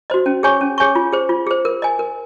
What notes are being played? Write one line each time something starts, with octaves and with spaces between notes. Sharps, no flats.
F#4 C5 D#5
C#4
G#4 C#5 G#5 C#6
C#4
G#4 C#5 G#5 C#6
F4
G#4 C5
F4
G#4 C5
A#4
D#5 G#5
A#4